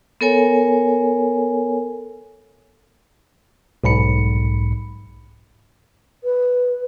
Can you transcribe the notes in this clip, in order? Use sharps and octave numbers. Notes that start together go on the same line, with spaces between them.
B3 A4 A#4 C#5 G#5
B1 G#2 B5 C#7
B4